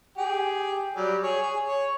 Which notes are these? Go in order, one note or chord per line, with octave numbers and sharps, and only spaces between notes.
G4 G#4
F#3 G3
G#4 C#5
G#4
C#5